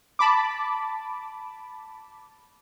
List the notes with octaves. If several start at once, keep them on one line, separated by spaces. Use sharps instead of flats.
A5 B5 D6